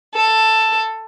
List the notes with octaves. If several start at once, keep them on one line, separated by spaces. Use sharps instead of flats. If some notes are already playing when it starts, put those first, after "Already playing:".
A4